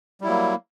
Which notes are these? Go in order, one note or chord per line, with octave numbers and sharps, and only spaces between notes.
F#3 G3 A#3 E4